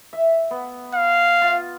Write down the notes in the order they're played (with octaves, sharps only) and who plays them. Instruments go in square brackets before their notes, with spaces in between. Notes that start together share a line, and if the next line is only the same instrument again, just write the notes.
[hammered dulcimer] E5
B3
[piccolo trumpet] F5
[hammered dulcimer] F4